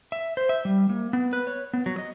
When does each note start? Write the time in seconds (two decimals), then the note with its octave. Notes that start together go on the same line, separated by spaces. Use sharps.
0.12 E5
0.37 C5
0.49 E5
0.65 G3
0.89 A#3
1.13 B3
1.33 B4
1.47 C#5
1.74 B3
1.86 F#3
1.98 D#5